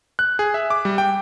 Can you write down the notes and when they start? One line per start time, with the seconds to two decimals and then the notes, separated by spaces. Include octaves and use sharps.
0.19 F#6
0.39 G#4
0.54 E5
0.70 D6
0.85 G3
0.98 G5